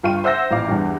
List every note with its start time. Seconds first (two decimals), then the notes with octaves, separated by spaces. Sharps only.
0.03 G1 F4 G5 C#6 D#7
0.24 C5 E5 F#5 E6 G6 A#6
0.51 A1 A#2 F5 D6
0.68 E2 G2